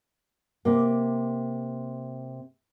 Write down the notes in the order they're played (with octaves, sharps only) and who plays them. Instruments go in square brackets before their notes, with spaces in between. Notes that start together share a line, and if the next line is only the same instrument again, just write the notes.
[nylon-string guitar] C3 A#3